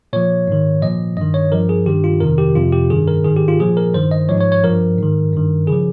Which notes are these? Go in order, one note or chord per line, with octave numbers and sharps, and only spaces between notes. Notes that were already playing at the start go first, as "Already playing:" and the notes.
A#2 F3 C#5
G#2 D#3
A#2 F3 D#5
G2 D#3 D#5
C#5
G2 F3 A#4
G#4
G2 D#3 G4
F4
F2 C3 D#3 A#4
G4
F2 C3 F3 F4
G4
G2 D#3 G#4
A#4
G#2 D#3 G#4
G4
F4
A#2 F3 G#4
A#4
G2 D#3 C5
D#5
G#2 F3 C#5
C#5
C#5
G2 F3 A#4
G#2 D#3
G2 D#3
C#3 F3 G#4